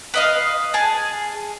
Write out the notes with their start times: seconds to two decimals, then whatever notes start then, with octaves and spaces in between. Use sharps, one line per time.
0.14 B4 D#5 F5
0.74 G#4 G#5 A5